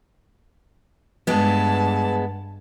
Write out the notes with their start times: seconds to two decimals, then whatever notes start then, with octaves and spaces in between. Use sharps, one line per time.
1.27 G2 G#3 B3 A5